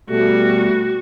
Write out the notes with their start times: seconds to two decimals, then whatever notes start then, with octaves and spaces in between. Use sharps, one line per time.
0.10 B2 G3 A3 F#4